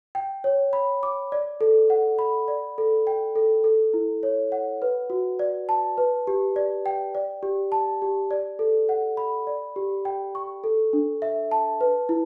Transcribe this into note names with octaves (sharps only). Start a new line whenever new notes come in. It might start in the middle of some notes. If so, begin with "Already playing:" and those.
G5
C#5
B5
D6
D5
A4
F#5
B5
D5
A4
G5
A4
A4
E4
C#5
F#5
B4
F#4
D5
A5
B4
G4
D5
G5
D5
G4
A5
G4
D5
A4
F#5
B5
D5
G4
G5
C#6
A4
D4
E5
A5
B4
E4